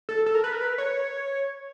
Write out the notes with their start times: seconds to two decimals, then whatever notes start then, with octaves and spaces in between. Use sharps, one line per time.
0.09 A4
0.26 A4
0.35 A#4
0.44 B4
0.52 A#4
0.61 B4
0.78 C#5